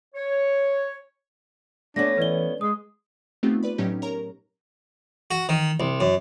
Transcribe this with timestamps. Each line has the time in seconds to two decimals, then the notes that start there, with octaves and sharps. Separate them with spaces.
0.15 C#5
1.96 A3 B3 C#4 D4 A#6
2.18 E3 B4 D5 G7
2.61 G#3 D#6
3.43 A3 B3 C4 D#4 F4 G4
3.63 B4 D5 B5
3.78 A2 F#3 C#4 D#4 G4
4.02 A#4 C#5 A#5
5.31 F#4
5.49 D#3
5.80 C2
6.00 F#2